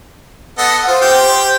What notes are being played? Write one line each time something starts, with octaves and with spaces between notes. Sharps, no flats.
B3 A4 D#5 F#5
F4 C5
G4 G5